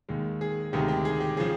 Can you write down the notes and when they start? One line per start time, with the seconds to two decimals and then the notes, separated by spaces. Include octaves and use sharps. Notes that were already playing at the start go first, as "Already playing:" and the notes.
0.09 D#2 D#3 G#3
0.41 G#4
0.73 D2 C3 D#3 G#3 G4
0.88 G4
1.05 G#4
1.20 G4
1.37 C#3 F3 G#4